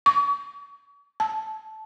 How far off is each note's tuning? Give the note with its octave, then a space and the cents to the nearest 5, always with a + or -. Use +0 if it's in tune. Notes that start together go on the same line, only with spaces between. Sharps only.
C#6 +40
A5 -15